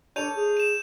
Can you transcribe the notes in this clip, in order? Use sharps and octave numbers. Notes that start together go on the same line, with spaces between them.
D4 A4 C#5 G6 D#7 F7
G#4
D#7 E7